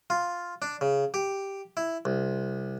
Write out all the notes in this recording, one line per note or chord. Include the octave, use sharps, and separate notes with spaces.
F4
D4
C#3
G4
E4
C2